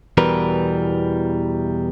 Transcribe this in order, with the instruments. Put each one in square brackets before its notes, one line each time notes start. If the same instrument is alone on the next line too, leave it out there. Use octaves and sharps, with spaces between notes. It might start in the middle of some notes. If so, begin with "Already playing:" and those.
[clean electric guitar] E2 B2 E3 G3 A#4 B4